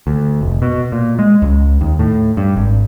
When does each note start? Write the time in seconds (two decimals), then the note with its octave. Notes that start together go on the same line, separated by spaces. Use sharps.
0.07 D2
0.41 F1
0.62 B2
0.92 A#2
1.19 G#3
1.42 C#2
1.81 D#2
1.99 A2
2.37 G2
2.56 G#1